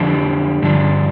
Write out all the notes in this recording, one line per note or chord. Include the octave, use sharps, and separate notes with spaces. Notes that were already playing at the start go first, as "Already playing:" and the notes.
Already playing: F2 D3 F3 D4 G4
G2 D3 F3 D4